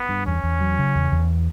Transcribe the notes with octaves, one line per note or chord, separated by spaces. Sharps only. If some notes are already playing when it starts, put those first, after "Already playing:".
Already playing: B3
G2
E2 C#4
E2
F#3
C#3
E2
E2